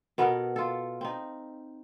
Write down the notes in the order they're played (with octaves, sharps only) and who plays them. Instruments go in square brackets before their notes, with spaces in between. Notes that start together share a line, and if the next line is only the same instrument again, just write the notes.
[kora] B2 B3 A4 A#4
F4 A4
C4 D#4